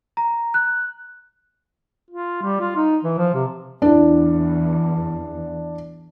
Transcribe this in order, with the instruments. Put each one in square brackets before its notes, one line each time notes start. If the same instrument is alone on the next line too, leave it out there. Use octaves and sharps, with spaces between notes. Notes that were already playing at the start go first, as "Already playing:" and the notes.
[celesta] A#5
F#6
[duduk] F4
G3
F4
D#4
E3
F3
C3
[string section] E2 [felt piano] D4 E4